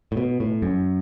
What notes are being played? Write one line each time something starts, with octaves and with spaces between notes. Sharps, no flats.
A2
B2
A2
F#2